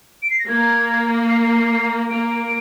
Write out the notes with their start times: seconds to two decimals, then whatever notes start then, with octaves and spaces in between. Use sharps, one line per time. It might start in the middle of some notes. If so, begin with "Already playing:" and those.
0.23 D7
0.30 C7
0.39 A#6
0.48 A#3 G#6
1.29 C7
2.10 A#3 D7